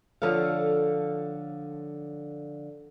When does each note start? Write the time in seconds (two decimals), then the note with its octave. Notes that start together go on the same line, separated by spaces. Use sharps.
0.22 D3 F3 A4 C#5 F5